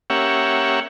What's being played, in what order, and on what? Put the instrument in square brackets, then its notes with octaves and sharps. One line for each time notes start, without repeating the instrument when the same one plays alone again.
[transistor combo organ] A#3 C#4 G4 C#5 E5 F#5